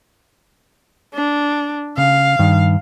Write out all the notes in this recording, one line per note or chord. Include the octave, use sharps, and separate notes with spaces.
D4
C#3 F5
G2 D#3